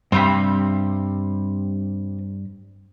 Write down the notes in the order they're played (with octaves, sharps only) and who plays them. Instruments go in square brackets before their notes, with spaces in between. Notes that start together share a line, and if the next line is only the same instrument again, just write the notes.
[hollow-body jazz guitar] G2 B5 [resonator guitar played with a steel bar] C3 G3 C4